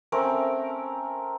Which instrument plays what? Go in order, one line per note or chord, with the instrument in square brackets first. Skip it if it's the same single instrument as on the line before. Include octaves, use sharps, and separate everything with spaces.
[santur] A3 C4 C#4 A#4